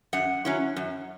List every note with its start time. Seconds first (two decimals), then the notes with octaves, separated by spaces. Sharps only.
0.13 F#2 F#5
0.45 F#3 C#4 E4
0.76 F#2